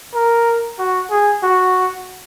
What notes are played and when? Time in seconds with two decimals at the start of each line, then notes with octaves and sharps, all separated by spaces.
0.14 A#4
0.79 F#4
1.11 G#4
1.43 F#4